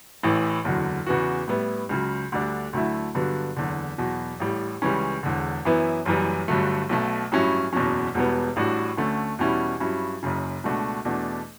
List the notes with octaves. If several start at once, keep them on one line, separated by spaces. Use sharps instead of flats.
A1 A2 E3
F#1 E2 D3 F#3
E2 C#3 E3 B3 F#4
A2 G3 B3 E4
C#2 C#3 F#3
D2 D3 G3 D4
D2 D3 F#3 A3 E4
G2 D3 F#3 B3
F#1 E2 D3
E2 B2 F#3
A1 A2 G3
C#2 C#3 E3 G3 C#4
E1 E2 D3
F#2 E3 B3 E4
F#1 F#2 E3 G3
G1 G2 D3 F#3 A3
B1 B2 A3
A1 G2 F#3 C#4 E4
F#1 E2 B2 F#3 C#4
E1 E2 B2 G3 B3
A1 A2 G3 D4 F#4
D2 D3 A3 C#4
E2 B2 G3 C#4 E4
G2 F#3 C#4 E4
F#1 F#2 C#3
C#2 B2 A3 D4 F#4
E2 B2 A3 D4